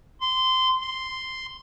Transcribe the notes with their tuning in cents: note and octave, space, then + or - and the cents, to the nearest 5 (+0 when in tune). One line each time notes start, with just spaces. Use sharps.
C6 -20
C6 -5